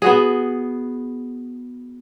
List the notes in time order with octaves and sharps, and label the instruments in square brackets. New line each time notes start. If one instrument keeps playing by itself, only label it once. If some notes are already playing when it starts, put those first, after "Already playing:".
[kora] B3 F#4 G#4